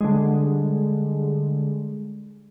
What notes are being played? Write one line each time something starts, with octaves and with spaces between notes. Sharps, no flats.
D3 G3 G#3